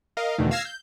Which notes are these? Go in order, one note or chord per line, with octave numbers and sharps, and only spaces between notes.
A#4 D#5 F5
E2 B2 D3 D#3 A3
F5 E6 F6 G#6 A#6 C7
G6